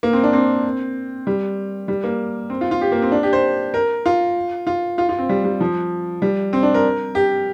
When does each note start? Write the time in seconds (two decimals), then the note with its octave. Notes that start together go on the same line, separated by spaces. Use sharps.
0.03 A#3
0.13 C4
0.23 D4
0.33 C4
1.27 G3
1.88 G3
2.04 A#3
2.50 C4
2.61 F4
2.71 F4
2.81 G4
2.92 A#3
3.02 C4
3.12 D4
3.23 G4
3.33 C5
3.74 A#4
4.06 F4
4.67 F4
4.98 F4
5.09 F4
5.19 C4
5.29 G3
5.44 G3
5.61 F3
6.22 G3
6.53 C4
6.63 D4
6.74 A#4
7.15 G4